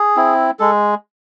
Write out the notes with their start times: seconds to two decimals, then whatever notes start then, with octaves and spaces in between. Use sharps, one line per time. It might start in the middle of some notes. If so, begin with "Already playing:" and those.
Already playing: G#4
0.17 C4 E4
0.59 G#3 A4